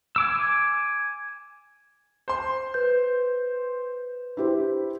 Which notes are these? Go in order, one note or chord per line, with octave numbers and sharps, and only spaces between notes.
G#5 D6 E6
C5 C6
B4 G6
E4 G4 C5